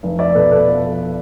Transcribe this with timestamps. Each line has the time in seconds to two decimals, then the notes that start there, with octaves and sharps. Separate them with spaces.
0.03 F1
0.19 D5 E5
0.35 B2 A4 B4
0.51 A4 B4
0.68 F3